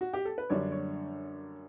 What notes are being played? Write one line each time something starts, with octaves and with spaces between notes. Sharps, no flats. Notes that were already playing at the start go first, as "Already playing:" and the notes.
F#4
G4
A4
B4
F#2 D3 G3 D4 C#5
C#5